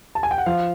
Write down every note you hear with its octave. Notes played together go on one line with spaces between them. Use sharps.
A5
G#5
G5
F#5
F3 F5